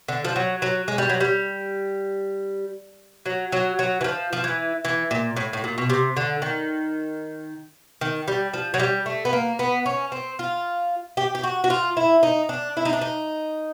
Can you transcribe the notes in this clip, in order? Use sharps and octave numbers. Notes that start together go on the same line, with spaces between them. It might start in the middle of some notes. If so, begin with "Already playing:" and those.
D3
F3
F#3
F#3
G#3
G3
F#3
G3
F#3
F#3
F#3
E3
F3
F3
E3
E3
A#2
A2
A2
A#2
B2
C3
D3
D#3
D#3
G3
F3
F#3
G3
A3
B3
A#3
B3
C#4
C4
F4
G4
G4
F#4
F#4
F4
E4
D#4
D4
E4
D#4
D4
D#4